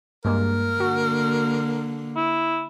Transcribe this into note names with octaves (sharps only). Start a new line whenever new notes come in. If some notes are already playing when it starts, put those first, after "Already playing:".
G2 G#3 A#3 A#4
D3 A#3 F#4
E4